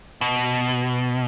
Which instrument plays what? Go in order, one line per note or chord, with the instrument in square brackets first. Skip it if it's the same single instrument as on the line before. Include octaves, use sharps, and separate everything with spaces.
[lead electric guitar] B2